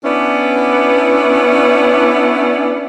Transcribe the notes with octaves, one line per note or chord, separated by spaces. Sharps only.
B3 C#4 D4 E4 D5